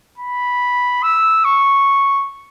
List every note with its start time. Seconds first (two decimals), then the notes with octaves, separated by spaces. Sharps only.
0.18 B5
1.03 E6
1.45 C#6